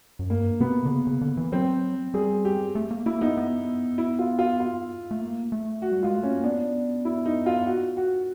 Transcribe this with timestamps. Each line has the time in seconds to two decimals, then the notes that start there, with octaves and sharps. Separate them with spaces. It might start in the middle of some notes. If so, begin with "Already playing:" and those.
0.19 F#2
0.29 G2 A#3
0.60 C3 B3
0.85 D3
0.91 C#3
1.07 C#3
1.21 D3
1.37 E3
1.52 F#3 C4
2.14 G3 G#4
2.45 G4
2.75 A3
2.91 A#3
3.06 A#3 E4
3.21 B3 D#4
3.37 B3
3.98 E4
4.19 F4
4.39 F4
4.60 F4
5.11 A3
5.22 A#3
5.52 A3
5.82 F#4
5.92 G3
6.03 G#3 F4
6.18 A3
6.23 C#4
6.31 A#3
6.44 B3 D4
7.05 E4
7.26 D#4
7.46 F4
7.66 F#4
7.97 F#4